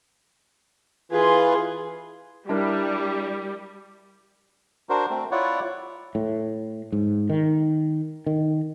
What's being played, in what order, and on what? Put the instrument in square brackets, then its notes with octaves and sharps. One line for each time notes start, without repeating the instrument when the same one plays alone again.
[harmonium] E3 F4 B4 [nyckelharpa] G#4 C6
[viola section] G3 [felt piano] D4 E4 A#4
[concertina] D4 F#4 A#4 C5
A3 C4
E4 F4 C#5 D5 F#5
[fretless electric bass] A2
G#2
D#3
D#3